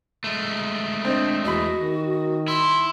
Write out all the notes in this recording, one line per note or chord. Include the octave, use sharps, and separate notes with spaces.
G#3 A3
C4 D4 D#5
E2 F#4 D#5 B5
D#3
E4 C6